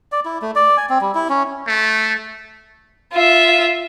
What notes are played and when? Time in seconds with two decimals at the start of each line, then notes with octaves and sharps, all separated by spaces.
0.12 D5
0.25 E4
0.42 A3
0.55 D5
0.77 G#5
0.89 C4
1.01 G3
1.15 E4
1.30 C#4
1.67 A3
3.13 F4 E5